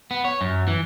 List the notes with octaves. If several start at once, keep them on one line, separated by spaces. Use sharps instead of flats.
B3
C#5
F#2
E3